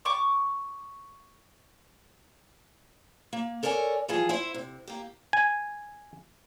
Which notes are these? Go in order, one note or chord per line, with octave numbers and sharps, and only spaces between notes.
C#6 D6
A#3
A4 A#4 C#5 D5 G5 G#5
E3 F3 G3 G#4
E4 C5 E5
C3
A#3 G4
G#5